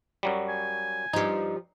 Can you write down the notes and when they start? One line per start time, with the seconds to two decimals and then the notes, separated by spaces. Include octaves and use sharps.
0.23 F#2 F#3 G3
0.48 G#5
1.13 G2 F3 D#4 G4